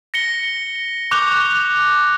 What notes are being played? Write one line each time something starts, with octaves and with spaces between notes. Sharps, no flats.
A#6 C#7 G7
C#6 D6 F#6 G6 F7 G7